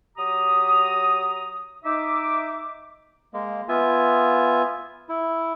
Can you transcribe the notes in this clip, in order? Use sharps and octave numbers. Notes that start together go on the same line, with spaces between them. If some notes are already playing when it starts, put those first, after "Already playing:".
F#3 G4 A#5 D#6
D#4 E5 D6
G#3 A#3
B3 F4 E5 G#5
E4